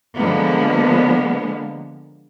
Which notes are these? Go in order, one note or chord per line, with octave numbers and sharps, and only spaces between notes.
D3 F3 G#3 A#3 B3